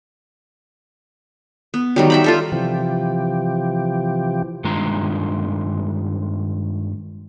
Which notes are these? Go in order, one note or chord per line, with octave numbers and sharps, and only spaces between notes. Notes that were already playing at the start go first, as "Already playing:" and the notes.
B3
D#3 F#3 G3
E5 G5 B5
F4 A4 E5
C3 E3 F3 G4
G2 D#3 G#3 D4 F4 A#5